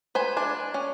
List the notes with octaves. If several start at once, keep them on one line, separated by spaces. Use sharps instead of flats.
B4 C5 G#5
D4 G#5
C#4